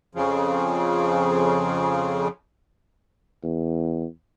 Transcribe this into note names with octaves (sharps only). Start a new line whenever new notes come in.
F2 C#3 F3
E2